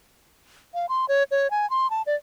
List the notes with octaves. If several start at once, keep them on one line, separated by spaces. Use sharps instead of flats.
F5
C6
C#5
C#5
G#5
C6
A5
D5